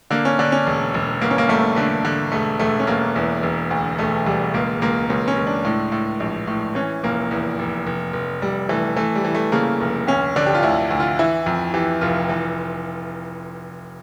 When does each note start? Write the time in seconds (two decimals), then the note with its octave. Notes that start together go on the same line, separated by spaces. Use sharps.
0.11 D3 A#3
0.25 C#4
0.39 D3 D4
0.52 C#4
0.67 E1
0.94 E1
1.21 G1 A#3
1.31 C#4
1.38 A#3
1.49 G1 A3
1.76 D3 A3
2.05 D3
2.32 E1 A3
2.59 E1 A3
2.80 C#4
2.87 E1 A#3
3.16 E2
3.43 E1
3.71 D2
3.98 E1 A3
4.26 E1 G3
4.54 C#2 A#3
4.82 C#2 A#3
5.09 C#2 C#4
5.28 C#4
5.37 C#2
5.47 D4
5.65 A2
5.92 A2
6.20 A#1
6.47 A2
6.75 E3 C#4
7.04 F1 A#3
7.31 E2
7.59 F1
7.87 F1
8.13 F1
8.42 F1 G3
8.69 E3 A3
8.96 E3 A3
9.15 G3
9.24 E3
9.35 A3
9.52 C#3 A#3
9.81 F1
10.07 D2 C#4
10.36 D3 D4
10.46 G4
10.54 F4
10.63 D2 E4
10.90 D2
11.00 F4
11.19 E3 E4
11.46 F2
11.74 E3 G4
12.01 F1 F4
12.29 E3